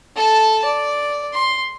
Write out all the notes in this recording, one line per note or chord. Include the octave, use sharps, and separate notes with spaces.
A4 A5
D5
C6